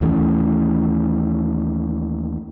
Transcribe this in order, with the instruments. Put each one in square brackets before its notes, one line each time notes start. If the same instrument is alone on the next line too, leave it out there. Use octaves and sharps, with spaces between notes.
[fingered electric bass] D#2 E3 A3 C#4